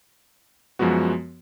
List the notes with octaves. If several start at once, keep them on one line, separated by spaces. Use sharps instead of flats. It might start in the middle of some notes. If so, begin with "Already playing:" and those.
F#2 F3 G#3 B3 F#4